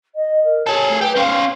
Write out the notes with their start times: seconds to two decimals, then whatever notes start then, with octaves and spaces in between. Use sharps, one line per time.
0.15 D#5
0.44 A#4
0.67 G#4 A4 C#5
0.89 A3
1.01 G4 B4
1.17 C#4 C5 F5